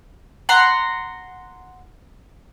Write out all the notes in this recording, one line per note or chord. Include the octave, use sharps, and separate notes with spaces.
F#5 A#5 C6